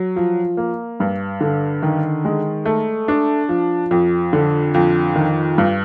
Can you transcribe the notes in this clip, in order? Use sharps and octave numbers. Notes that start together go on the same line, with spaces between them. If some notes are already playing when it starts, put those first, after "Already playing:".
Already playing: F#3
F3
A#3
G2
D3
D#3
G#3
A3
D4
F3
F2
D3
F2
D#3
G2